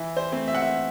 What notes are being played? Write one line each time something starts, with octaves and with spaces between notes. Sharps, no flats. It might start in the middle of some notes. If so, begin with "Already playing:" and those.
Already playing: E3 E4
C5
A3 C4
E5
F#5
E5